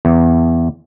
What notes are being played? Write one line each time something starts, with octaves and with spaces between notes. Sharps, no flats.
E2